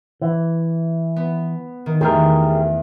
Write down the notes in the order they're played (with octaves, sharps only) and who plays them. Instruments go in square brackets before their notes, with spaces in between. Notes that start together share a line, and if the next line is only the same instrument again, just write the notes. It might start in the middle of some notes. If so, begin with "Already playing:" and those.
[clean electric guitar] E3
[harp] B3
D#3
[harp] E2 A3 [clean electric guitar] G4 G#4 A#4